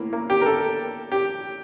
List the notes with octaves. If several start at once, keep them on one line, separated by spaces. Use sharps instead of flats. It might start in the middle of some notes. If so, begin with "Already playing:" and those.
Already playing: A2 E3 A#3
A#3
G4
A#4
A4
G4